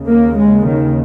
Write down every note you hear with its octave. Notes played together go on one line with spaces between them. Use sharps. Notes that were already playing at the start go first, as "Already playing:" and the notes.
Already playing: D#2 C#3
A#3
G#3
D#3